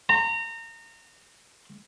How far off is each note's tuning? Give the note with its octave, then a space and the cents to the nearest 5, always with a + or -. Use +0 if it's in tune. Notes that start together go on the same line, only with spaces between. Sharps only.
A#5 -30